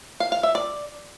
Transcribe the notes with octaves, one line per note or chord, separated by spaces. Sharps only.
F5
F5
E5
D5